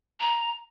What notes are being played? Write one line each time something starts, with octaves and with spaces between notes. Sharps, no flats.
A#5